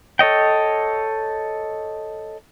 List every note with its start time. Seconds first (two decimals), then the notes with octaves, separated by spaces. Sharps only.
0.19 A4 C#5 D#5 G5